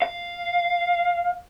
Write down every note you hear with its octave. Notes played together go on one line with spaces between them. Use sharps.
F5